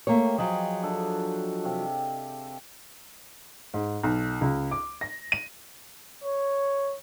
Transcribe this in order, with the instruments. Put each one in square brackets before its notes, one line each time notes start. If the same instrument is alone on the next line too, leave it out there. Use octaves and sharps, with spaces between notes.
[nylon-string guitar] A3 A#3 C#5 [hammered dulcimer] G4
[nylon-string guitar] F3 F#3 [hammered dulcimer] G#4 D#5
[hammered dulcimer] D4 A4
C3 G4 F5
[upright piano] G#2
B1
C#2
D6
A#6
D#7
[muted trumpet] C#5